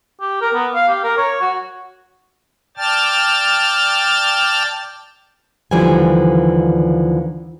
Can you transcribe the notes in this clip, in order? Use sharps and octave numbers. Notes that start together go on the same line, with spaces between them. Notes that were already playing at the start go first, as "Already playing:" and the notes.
G4
A#4
B3
F5
G4
A#4
C#5
F#4
D5 G5 A5 F6 A6
D#2 D3 E3 F3 G3 G#5